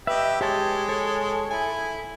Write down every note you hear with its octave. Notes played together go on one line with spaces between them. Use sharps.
G4 B4 D#5 E5
G#3 G4 C#5 A5
A4 C#5
E4 G#5